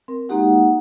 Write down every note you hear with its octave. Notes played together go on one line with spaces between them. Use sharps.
C4 A#4
G#3 A#3 D#4 F#4 G4 F#5